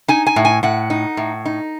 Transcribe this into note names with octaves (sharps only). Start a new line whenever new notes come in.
D#4 G#5
G#5
A2
G#5
A2 F#5
D#4
A2
D#4